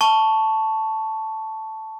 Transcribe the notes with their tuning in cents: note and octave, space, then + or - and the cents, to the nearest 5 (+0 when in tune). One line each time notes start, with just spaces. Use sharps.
A5 +0 C#6 +5